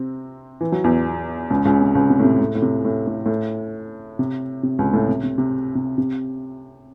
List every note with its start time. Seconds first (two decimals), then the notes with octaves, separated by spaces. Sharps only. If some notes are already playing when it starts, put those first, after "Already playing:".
Already playing: C3 C4
0.61 E3
0.72 F#3
0.84 E2 E3
1.50 C#2 C#3
1.65 C#2 C#3
1.81 C3
1.95 C#2 C#3
2.10 C3
2.19 A2
2.24 C3
2.41 A2
2.55 A2
2.62 C3
2.85 A2
3.07 A2
3.26 A2
4.19 C3
4.63 C3
4.79 C#2 C#3
4.93 A2
5.08 C3
5.23 C3
5.38 C3
5.75 C3
5.98 C3